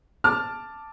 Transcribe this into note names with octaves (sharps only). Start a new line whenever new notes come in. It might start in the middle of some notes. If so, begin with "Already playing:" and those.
A5 D6 F6